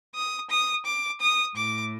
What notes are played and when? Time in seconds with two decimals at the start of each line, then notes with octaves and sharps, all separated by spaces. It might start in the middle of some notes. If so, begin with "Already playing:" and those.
0.14 D#6
0.49 D#6
0.85 D6
1.20 D#6
1.55 A2 D6